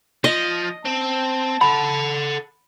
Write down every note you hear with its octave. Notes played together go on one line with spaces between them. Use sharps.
F3 D#5
C4 A5
A4 F#5 B5